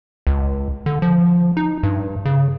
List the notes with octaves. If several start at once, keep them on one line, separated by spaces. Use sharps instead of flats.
C#2
D3
F3
D#4
G2
C#3